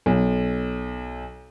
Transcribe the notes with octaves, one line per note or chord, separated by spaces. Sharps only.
B1